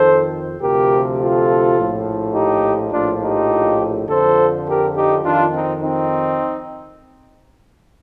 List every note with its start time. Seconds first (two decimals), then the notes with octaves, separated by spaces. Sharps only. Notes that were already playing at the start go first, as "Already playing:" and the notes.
Already playing: F2 D#3 A4 C5
0.60 D2 C3 F3 G4 A#4
1.18 F4 A4
1.76 A#1 A2 F3
2.34 D#4 G4
2.92 A#1 A2 F3 D4 F4
3.21 D#4 G4
4.08 F2 D3 F3 A4 C5
4.67 G4 A#4
4.95 D#4 G4
5.24 F2 D#3 D4 F4
5.53 C4 D#4
5.82 C4 D#4